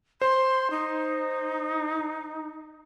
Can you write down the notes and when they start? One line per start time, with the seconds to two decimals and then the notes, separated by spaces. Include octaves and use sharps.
0.21 C5 C6
0.71 D#4